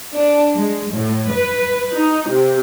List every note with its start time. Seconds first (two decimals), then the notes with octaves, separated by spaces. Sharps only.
0.16 D4
0.56 G#3
0.93 A2
1.32 B4
1.95 D#4
2.29 C3